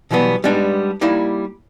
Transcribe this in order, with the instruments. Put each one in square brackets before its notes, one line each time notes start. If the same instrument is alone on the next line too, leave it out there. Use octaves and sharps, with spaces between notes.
[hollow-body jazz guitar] B2 E3 F#3 G3 B3
G3 G#3 B3 D4 D#4
G3 A#3 D#4 E4